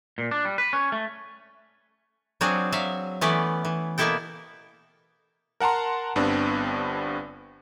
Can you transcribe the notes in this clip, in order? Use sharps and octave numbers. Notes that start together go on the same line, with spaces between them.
A#2
D4
G3
B4
C#4
A3
F#3 C4 D4 F4 F#4 G#4
F#3 E5 F5
E3 A3 B3 C#4 B4 D5
E3
B2 A#3 B3 E4 A4 G5
A#4 F#5 A5 A#5 C6
G1 G2 B3 C4 D4